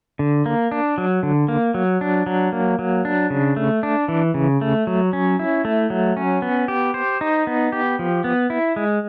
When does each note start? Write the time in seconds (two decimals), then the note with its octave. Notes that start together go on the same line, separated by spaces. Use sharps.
0.19 D3
0.46 A#3
0.71 D4
0.98 F#3
1.23 D3
1.48 A#3
1.74 F#3
2.01 D4
2.26 F#3
2.52 A#3
2.79 F#3
3.05 D4
3.30 C#3
3.56 A3
3.83 D4
4.08 E3
4.34 C#3
4.61 A3
4.87 F#3
5.13 C#4
5.39 E4
5.65 A3
5.90 F#3
6.17 C#4
6.42 B3
6.68 G4
6.94 C5
7.21 D#4
7.47 B3
7.72 G4
7.99 F3
8.24 B3
8.50 E4
8.76 G#3